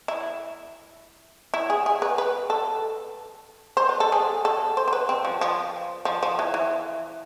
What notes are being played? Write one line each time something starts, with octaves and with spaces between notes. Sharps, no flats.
E4
E4
G#4
G#4
B4
B4
A4
C5
B4
A4
G#4
A4
C5
C5
B4
C4
F3
F3
F3
F3
E3
E3